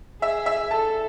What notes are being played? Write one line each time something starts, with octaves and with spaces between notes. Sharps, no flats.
G#4 E5
E5
A4 A5